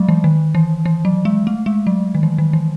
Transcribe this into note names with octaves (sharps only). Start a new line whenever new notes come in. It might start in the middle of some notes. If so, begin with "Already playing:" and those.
Already playing: F#3 G#3 A3
E3
D#3
E3
E3
F#3
G#3
A3
G#3
F#3
D#3
E3
D#3
E3